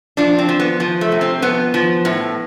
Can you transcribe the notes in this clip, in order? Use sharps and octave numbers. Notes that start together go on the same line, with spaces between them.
F3 D4
C4
F3
B3
F3
A3
C3
C4
F3 B3
F3
A2